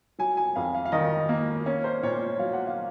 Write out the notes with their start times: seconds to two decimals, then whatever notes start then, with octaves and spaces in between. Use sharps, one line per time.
0.19 F#3 G#5
0.37 G#5
0.56 F2 F5
0.75 F5
0.85 F5
0.92 D#3 D#5
1.29 A#3
1.66 C#4
1.84 C5
2.03 A#2 C#5
2.39 F#3 F5
2.53 F#5
2.67 F5